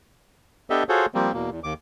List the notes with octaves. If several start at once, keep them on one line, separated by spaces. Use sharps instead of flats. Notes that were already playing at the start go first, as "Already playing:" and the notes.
B3 D4 G4 A4 D#5 E5
F4 F#4 G#4 A4 C5 C#5
F3 G3 A#3 C4
E2 B2 A#3
E2
D#2 D6